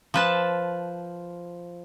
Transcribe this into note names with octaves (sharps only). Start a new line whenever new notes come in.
F3 B4 A5